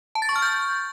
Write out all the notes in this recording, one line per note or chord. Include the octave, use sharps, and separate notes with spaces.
A5
A6
C#6
F6
G6